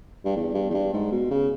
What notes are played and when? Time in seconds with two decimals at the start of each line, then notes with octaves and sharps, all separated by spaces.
0.25 G2
0.36 E2
0.54 G2
0.70 E2
0.74 G2
0.93 G#2
1.12 B2
1.31 C#3